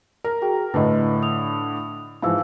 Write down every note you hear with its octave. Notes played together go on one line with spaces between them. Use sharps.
A#4
F#4 G#4 G5
A2 D3 B4 D#5
D#6 F7
G#2 E3 F3 F5 E6